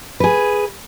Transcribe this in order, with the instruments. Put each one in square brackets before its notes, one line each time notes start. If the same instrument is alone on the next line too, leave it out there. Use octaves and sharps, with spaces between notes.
[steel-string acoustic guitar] G#4 B4